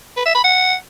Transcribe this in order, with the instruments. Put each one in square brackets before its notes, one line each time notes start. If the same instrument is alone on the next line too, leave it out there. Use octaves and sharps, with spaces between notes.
[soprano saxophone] B4
E5
B5
F#5